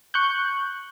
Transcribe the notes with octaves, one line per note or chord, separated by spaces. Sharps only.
C#6 F#6 G6